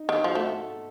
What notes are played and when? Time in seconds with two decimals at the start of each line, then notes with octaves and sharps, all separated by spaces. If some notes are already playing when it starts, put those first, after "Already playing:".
Already playing: D#4
0.09 D#3
0.24 F3 F#4
0.35 A3 A4